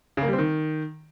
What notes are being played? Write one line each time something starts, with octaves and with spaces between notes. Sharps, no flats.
C#3
A#3
G3
C4
D#3